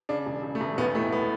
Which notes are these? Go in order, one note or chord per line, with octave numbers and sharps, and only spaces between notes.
C#3 D4
E1
C#3
A3
E1
B1 B3
A2 A3
B3